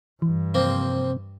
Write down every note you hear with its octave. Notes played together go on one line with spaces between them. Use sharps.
G2 E3
C3 F3 A#3 C4